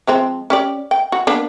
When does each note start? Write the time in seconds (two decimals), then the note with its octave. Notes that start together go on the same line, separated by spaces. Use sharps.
0.07 F3 G#3 C4
0.50 C#4 G4 D5
0.91 G5
1.12 F#4
1.27 A#3 B3 D4